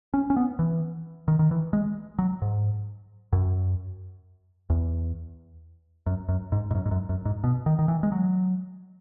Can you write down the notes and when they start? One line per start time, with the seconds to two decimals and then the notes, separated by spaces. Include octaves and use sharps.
0.14 C#4
0.30 C#4
0.36 B3
0.59 E3
1.28 D#3
1.39 D#3
1.51 E3
1.73 G#3
2.19 F#3
2.42 G#2
3.33 F#2
4.70 E2
6.06 F#2
6.29 F#2
6.52 G#2
6.71 G#2
6.75 F#2
6.86 G#2
6.91 F#2
7.09 F#2
7.25 G#2
7.44 B2
7.66 D#3
7.79 D#3
7.88 E3
8.03 G#3
8.12 F#3